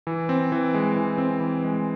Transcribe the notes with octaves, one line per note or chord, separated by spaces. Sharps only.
E3
C4
E3
G#3
E3
C4
E3
G#3